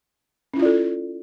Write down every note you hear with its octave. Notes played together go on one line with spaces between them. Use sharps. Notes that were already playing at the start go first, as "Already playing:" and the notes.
C#4 E4 F4 A4 D5